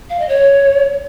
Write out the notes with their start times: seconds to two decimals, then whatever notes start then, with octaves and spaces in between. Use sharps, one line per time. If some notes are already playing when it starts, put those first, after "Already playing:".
0.10 F5
0.19 D#5
0.29 C#5